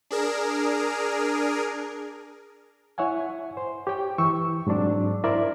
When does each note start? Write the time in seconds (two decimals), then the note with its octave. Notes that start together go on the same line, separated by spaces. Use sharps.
0.11 D4 G#4 A#4
2.98 E4 C#5 E5 F#5 G#5
3.57 C5
3.87 G4 C#5 G5
4.18 E3 C#6 E6
4.67 G#2 F#3 C4 D4
5.24 E4 A#4 C5 D5 E5